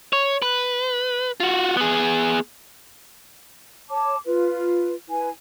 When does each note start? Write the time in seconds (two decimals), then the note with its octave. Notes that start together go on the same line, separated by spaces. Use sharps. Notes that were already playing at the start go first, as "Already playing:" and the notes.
0.13 C#5
0.42 B4
1.40 F4 F#4
1.77 B3 G#4
3.90 C#5 A5 D6
4.26 F4 B4
5.10 E4 B4 G#5